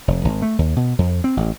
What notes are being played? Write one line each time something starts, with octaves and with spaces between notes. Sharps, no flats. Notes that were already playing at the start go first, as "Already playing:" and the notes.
F1
G#1
A3
D#2
B2
F2
C4
A1